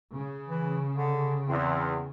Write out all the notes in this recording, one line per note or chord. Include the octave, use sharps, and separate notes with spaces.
C#3
E3
D3
E2 C4